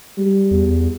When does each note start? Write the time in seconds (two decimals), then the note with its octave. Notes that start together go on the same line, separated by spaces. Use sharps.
0.18 G3
0.51 E2